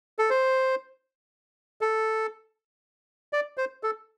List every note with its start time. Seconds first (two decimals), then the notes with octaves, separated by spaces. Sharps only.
0.19 A4
0.30 C5
1.81 A4
3.33 D5
3.58 C5
3.83 A4